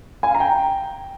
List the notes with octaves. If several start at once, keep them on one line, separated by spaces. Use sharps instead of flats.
G#5
F5
A#5
G5